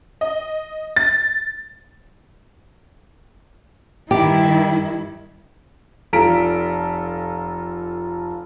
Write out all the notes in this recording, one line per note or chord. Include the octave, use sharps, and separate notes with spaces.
D#5
A6
G2 D#3 E4 G4
F1 F4 A4 A#5 B6 D7